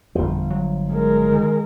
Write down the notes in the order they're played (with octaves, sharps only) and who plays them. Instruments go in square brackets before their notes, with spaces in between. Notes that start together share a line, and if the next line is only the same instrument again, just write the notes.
[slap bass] G1 F3 [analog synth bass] F2
[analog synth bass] F#3
[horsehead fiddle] G#3 A#4
[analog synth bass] D#3